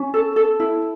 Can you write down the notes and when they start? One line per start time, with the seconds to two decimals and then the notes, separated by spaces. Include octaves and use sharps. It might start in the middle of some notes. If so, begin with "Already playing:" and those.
Already playing: C#4
0.14 A4
0.36 A4
0.60 E4